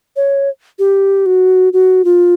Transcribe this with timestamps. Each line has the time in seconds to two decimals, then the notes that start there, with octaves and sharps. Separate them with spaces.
0.16 C#5
0.79 G4
1.26 F#4
1.73 F#4
2.05 F4